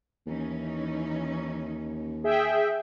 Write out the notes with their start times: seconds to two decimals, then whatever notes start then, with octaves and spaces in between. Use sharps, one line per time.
0.26 D#2 E3 C#4 D#4
2.24 G#4 E5 G5